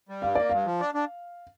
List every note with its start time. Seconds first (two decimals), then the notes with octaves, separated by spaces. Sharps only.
0.09 G3
0.22 G2 F5
0.35 A#3 D5
0.49 G2 F5
0.66 F3
0.80 D4
0.94 D4